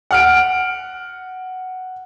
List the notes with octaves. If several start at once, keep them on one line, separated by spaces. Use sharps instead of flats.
F#5 F6 D7